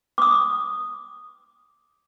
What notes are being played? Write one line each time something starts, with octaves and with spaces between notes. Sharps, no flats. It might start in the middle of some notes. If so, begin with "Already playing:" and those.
D6 D#6